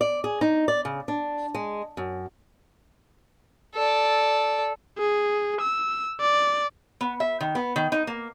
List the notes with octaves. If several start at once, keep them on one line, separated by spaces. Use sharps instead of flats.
D5
G#4
D#4
D5
C#3
D4
G#3
F#2
A4 D5
G#4
E6
D5
B3
E5
D#3
B3
D#3
D#4
A#3